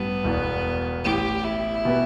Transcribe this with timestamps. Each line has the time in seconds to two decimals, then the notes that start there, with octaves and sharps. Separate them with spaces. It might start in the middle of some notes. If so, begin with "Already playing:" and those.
Already playing: A1 G2 G3 B3
0.24 E1 E2 B2
1.04 A1 A2 E3 G4
1.44 E4
1.85 B2 B3 G4 B4